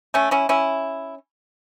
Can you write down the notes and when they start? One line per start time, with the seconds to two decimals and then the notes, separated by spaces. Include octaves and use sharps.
0.14 A3 C#4
0.31 C#4 E4
0.49 C#4 E4